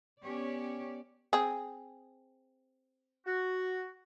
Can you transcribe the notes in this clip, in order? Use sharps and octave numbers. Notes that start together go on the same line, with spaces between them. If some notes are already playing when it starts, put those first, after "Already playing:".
B3 C#4 G4 C#5 D5
C4 G#4
F#4